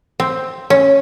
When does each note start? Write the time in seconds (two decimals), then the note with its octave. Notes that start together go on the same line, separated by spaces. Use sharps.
0.20 C4
0.70 C#4